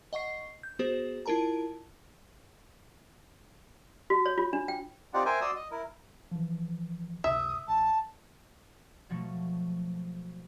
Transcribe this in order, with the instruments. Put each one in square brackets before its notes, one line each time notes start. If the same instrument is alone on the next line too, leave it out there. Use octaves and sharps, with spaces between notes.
[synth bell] D#5 F#5 C#6 C7
G6
B3 F#4 G#4 C5
E4 F4 A#4 A5 A#5
[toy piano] F#4
C#5
F4
D4
G5
[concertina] C4 D#4 F4 G4 D5 F#5
A#4 C5 E5 G5 G#5
F#4 D5 C6 D#6 E6
D#5
E4 A#4
[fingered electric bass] E3 F3
[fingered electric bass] C#2 F#2 C3 [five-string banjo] E5 [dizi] D#6
[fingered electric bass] A1 [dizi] A5
[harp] B2 F3 F#3 A3